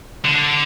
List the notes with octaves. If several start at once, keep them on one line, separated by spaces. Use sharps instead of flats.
D3